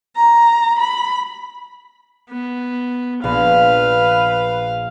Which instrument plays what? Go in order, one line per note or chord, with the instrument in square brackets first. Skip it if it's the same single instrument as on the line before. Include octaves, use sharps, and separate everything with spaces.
[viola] A#5
B5
[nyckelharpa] B3
[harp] A#1 [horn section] B4 [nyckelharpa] F5